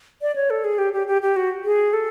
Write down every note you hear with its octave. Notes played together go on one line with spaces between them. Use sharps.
D5
C#5
A4
G#4
G4
G4
G4
G4
F#4
G#4
A4